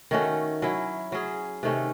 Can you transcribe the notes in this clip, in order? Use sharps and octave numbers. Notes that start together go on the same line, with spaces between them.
D#3 A3 C#4 F#4
F#3 C#4 E4
F#3 C#4 G#4
C3 D#3 A3 C#4